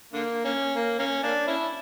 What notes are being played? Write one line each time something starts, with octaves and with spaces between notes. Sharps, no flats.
D3 A#3
A#3 C#4
A#3
A#3 C#4
A#3 D4
C#4 E4